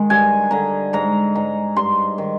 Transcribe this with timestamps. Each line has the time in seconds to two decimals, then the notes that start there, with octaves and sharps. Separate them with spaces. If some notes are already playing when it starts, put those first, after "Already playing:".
Already playing: D#3 G#3
0.10 G2 G#5
0.51 D3 A#5
0.93 G#2 A#5
1.35 G#2 A#5
1.76 G2 C6
2.18 D#3